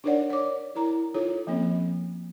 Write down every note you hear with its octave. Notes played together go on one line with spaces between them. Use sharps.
D4 D#4 A#4 C#5 D5 F#5
C#5 D6
E4 A#4 A#5
D#4 F4 A4 C#5
F3 A#3 C4 C#4